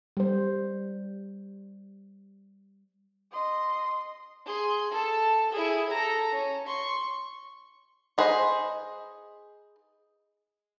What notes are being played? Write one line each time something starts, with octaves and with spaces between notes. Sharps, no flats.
G3 C5
D#5 C6
G#4 C6
A4 A5
E4 G#4
A4 A#5
C#4
C6 C#6
D#4 G#4 B4 C5 D#5